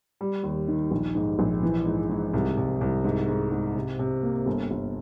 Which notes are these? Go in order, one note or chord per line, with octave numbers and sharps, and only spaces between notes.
G3
D#2
D#3
A#1
G#2
A#1
E3
G#2
G#2
C2
C2
C2
G#2
G#2
G#2
C3
C3
A#3
G1
G1